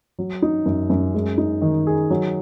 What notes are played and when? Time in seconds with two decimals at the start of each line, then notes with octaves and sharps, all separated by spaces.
0.19 F#3
0.42 D#4
0.66 F#2
0.90 F#2
1.14 G#3
1.38 D#4
1.62 D#3
1.87 G#4
2.10 F#3